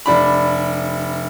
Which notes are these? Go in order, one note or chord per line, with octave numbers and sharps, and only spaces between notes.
F1 D4 B5